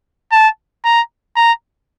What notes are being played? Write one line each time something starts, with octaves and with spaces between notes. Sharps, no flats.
A5
A#5
A#5